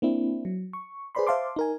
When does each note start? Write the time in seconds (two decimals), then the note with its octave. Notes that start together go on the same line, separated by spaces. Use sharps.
0.02 A#3 C4 D4 E4
0.45 F#3
0.73 C#6
1.15 G#4 B4 C5 D5 B5 C6
1.27 C5 E5 F5 A5 C6 D6
1.56 D#4 A#4 G#5